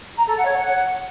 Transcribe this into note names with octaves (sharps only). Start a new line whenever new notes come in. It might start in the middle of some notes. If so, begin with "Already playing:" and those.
A#5
A4
F#5
C#5
F#5